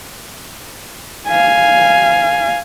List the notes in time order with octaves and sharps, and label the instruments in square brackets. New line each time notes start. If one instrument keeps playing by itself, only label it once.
[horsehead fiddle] F5 G#5